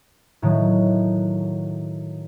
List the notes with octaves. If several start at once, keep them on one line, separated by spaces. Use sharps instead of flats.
A2 D#3 F#3